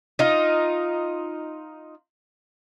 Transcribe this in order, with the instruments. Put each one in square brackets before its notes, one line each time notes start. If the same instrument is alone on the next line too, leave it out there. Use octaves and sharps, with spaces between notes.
[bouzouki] D#4 F4